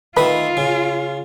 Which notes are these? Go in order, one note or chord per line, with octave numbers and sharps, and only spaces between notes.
D#3 A3 F4 B4 D#6
C#3